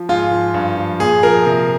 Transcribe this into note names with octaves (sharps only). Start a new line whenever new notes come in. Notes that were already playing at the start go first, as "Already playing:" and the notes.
Already playing: F3
G#2 F4
F3
G2
F3
A#2 G#4
F3 A#4
C3